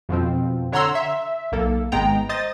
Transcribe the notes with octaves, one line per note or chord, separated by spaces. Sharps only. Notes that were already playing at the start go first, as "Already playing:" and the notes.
F2 B2 F3 C4
D3 C#5 F#5 A#5 C6 E6
E5
B1 A#3 A4
G#1 G#3 B3 G5 A#5
C5 D#5 D#6 A6